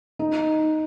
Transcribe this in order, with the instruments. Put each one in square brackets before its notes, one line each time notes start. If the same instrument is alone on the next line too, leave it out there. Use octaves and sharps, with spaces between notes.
[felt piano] D#4